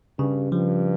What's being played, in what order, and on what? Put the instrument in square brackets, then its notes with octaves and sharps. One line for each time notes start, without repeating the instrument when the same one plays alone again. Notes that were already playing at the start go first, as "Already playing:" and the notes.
[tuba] G2 [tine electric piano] C#3
[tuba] G2 [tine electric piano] F3